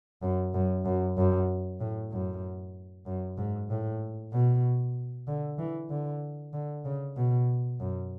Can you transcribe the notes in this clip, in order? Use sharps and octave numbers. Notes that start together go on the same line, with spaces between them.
F#2
F#2
F#2
F#2
A2
F#2
F#2
G#2
A2
B2
D3
E3
D3
D3
C#3
B2
F#2